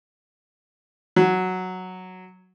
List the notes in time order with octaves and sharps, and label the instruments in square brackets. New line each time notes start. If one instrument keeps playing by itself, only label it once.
[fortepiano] F#3